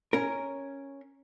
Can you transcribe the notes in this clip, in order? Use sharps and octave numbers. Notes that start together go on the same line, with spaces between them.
C#4 A#4